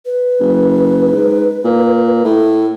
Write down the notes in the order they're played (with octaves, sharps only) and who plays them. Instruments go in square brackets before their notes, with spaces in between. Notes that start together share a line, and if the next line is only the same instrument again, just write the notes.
[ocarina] B4
[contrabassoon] F#1
G#2
A#2
[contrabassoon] A2 [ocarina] A4